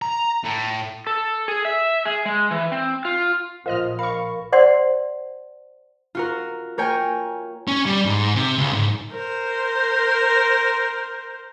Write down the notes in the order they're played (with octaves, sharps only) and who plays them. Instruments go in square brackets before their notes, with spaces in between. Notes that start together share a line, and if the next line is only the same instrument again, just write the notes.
[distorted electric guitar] A#5
A2
[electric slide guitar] A4
G#4
E5
G#4
G#3
E3
C4
F4
[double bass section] A#1 F3 [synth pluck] F4 D#5 F6 [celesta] A#4 C5
[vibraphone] A#4 [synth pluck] F5 C#6 [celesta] B5
[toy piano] C5 D5 F#5 C6
[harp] F4 F#4 A#4
A#3 A#4 C#5 G5 G#5
[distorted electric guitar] C#4
G3
G#2
C3
C#2
G#2
[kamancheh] A#4 C5